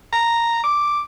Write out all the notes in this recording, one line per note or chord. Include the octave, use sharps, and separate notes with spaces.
A#5
D6